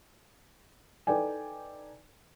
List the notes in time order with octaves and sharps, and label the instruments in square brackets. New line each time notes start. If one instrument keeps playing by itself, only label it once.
[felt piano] D#4 A4 B4 D5 G5 G#5